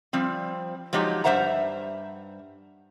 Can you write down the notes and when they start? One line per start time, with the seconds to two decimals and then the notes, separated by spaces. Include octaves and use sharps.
0.13 F3 G3 C4
0.93 F3 F#3 G#3 D#4 G4
1.24 G2 F3 C5 E5 F#5 A#5